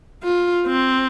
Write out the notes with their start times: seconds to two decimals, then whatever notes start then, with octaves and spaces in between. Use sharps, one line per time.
0.23 F4
0.66 C4